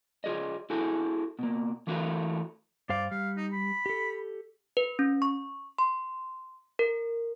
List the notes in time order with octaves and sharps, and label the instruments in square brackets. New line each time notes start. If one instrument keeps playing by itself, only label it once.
[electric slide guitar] F4 G#4 D5 D#5
E4 F#4 G#4 A4
B2 A#3
E3 A3 F4 F#4 G#4 A#4
[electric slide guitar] G2 C5 F5 [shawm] D5
[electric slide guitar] G3 [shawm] F5
[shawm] D#4
B5
[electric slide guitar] G4 A4
[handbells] B4
C#4
C#6
C6
A#4